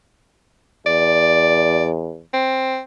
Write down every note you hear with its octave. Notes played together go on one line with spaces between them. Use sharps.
E2 D5
C4